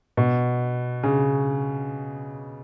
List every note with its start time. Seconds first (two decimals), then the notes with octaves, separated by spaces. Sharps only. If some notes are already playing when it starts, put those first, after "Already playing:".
0.17 B2
1.03 C#3